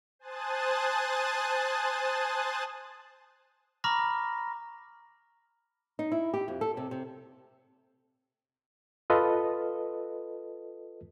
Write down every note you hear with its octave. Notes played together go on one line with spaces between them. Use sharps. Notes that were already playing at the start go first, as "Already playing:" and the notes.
C5 G#5 A5 D#6 F#6 A6
A#5 B5 C#6 D6 F6 A#6
D#4
E4
G4
F2
A4
C3
C3
F4 A4 B4 D#5